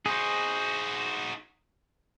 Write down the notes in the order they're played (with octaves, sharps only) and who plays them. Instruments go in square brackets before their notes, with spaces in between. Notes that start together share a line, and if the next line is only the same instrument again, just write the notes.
[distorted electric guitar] D#4 F#4 [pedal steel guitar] G#4 C5